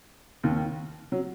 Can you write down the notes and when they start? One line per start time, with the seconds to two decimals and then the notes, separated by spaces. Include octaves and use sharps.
0.43 D#2 D#3
1.12 F#3